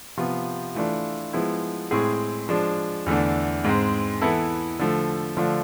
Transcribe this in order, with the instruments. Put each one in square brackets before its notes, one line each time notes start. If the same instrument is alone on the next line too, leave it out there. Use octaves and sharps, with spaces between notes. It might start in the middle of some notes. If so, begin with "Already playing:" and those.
[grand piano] C3 F3 B3 F4
E3 A3 D4 F4
F3 G#3 B3 E4
A2 G#3 C4 G#4
F3 G#3 D4
E2 D3 A3 D4
G#2 G#3 C4
E3 B3 E4 A4
D3 F3 A3
D3 F3 A3 D4 F4